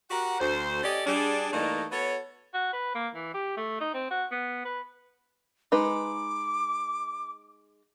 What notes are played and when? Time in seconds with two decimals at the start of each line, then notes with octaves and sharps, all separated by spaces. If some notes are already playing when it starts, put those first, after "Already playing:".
0.10 F#4 G4 A#4 F#5
0.40 D2 C5
0.83 C#4 G4 A4 D5 D#5
1.06 G3 D4 G#4
1.52 G2 E3 A3 A#3 D4 D#4
1.91 B3 F#4 A4 B4 C#5
2.54 F#4
2.73 B4
2.95 A#3
3.15 E3
3.34 G4
3.57 A3
3.81 D#4
3.94 C4
4.11 F#4
4.31 B3
4.65 B4
5.72 G#3 D#4 B4 D6